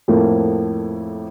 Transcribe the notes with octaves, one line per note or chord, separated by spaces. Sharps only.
F2 A2 F3 A#3